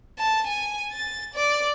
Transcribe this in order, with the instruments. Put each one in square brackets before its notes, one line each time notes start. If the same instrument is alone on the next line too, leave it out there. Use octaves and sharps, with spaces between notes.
[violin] A5
G#5
A6
D5